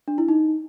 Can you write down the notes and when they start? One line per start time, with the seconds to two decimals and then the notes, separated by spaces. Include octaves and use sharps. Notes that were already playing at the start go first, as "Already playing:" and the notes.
0.08 D4
0.18 E4
0.28 D#4